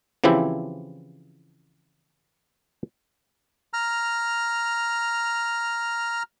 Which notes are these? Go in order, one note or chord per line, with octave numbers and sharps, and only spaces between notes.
C#3 E3 F3 C4 E4 G4
A#5 F6